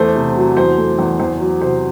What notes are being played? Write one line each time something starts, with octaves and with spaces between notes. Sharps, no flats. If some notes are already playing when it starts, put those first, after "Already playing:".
Already playing: E2 A3 C5
C3
F#3
E2 C5
A3
E2
E2 C5
F#3
C3 C5